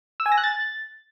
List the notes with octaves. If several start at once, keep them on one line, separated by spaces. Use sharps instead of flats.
E6
G#5
A#6
F#6
A6